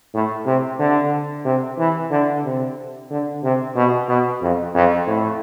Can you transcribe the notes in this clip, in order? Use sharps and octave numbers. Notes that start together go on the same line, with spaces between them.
A2
C3
D3
C3
E3
D3
C3
D3
C3
B2
B2
F2
F2
A2